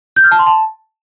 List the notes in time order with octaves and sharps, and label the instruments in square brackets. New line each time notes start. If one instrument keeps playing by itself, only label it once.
[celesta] G6
F6
A5
C6
A5